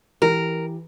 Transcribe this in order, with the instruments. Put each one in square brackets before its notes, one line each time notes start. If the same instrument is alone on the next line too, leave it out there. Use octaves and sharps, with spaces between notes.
[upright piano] E3 G4 [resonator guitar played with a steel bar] A#4